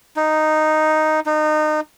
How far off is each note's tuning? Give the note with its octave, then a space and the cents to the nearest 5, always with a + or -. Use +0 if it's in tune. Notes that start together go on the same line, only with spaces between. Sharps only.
D#4 -5
D#4 -25